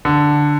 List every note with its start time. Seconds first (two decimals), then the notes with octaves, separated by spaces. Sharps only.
0.05 D3